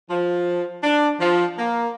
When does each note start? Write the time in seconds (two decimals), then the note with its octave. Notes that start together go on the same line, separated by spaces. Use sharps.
0.10 F3
0.83 D4
1.20 F3
1.58 A#3